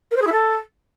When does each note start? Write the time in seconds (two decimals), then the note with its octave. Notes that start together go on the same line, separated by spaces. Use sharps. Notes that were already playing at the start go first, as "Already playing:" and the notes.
0.11 A#4
0.16 C5
0.21 G#4
0.27 E4
0.32 A4